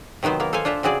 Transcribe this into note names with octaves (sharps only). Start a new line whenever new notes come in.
C3 D#3 F#3 B3 C5
A#3 B3 A#4
A4 C5 F5 G#5
D4 F4 C5 E5
C#3 C4 F#4 G#4 D5